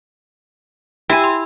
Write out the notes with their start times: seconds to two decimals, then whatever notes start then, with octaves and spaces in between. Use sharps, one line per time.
1.09 E4 G4 G5 G#5 E6
1.24 C6